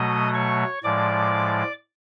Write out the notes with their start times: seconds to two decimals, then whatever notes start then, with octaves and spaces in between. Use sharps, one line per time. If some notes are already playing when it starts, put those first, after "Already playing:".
Already playing: B2 F#3 A3 D#5 D#6
0.34 C#5 C#6
0.83 A2 F3 G#3 D5 D6